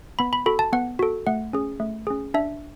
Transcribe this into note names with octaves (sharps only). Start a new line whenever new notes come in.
B3 B5
B5
F#4 A4 B5
A5
B3 F#5
F#4 A4
A3 F#5
C#4 G#4
A3
C#4 G#4
D4 E5